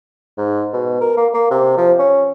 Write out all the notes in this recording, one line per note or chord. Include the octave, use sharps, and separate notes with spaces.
G#2
B2
A#4
A#3
A#3
C3
F3
C#4